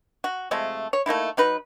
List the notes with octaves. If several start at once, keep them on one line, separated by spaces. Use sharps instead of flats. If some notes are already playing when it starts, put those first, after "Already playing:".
F#4
C3 F3 G#3 A3
C#5
A3 A#3 D#4 E4
F#3 D#4 B4